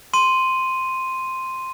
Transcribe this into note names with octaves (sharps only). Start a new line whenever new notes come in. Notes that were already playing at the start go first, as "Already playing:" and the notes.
C6 D#7